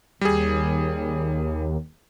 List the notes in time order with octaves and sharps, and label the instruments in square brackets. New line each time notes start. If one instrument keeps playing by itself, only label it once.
[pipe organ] D#2 [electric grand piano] G3 G#4